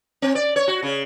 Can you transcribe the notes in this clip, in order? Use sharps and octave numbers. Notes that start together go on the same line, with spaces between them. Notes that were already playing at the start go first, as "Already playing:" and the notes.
C4
D5
C#5
F#4
C#3